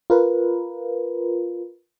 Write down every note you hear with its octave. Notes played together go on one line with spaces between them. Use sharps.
F4 A#4 B4